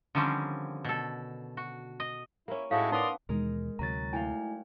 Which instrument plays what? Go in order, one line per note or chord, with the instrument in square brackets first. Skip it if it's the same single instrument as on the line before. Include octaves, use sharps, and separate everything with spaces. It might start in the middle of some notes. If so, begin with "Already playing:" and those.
[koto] D3 D#3 F3 G3 C4 C#4
B2 A4
F#4
D#5
[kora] A#3 C#4 [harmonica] E4
[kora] A2 [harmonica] G#3 D#4 E4 [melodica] F#4 G#4 A4 [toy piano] F5
[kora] B3 B4 [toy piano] D#4 D6 [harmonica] A#4 C6 D#6 [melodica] D5
[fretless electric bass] D#2 B2 E3 [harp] G#3 D#4 A#4
[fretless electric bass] D2 C3 [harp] F#3 G#5 [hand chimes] A#5 A6
[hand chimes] A3 E4 G#5 [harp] F5 G5